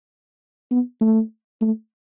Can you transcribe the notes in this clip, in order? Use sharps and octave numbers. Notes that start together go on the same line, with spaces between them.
B3
A3
A3